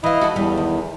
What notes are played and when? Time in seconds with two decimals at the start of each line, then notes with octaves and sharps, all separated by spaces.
0.04 E3 E4 D#5 F5
0.21 F#4 A4
0.36 E2 G3
0.57 D#3